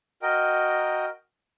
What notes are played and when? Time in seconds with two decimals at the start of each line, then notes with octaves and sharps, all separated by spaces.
0.22 F#4 A#4 D#5 G5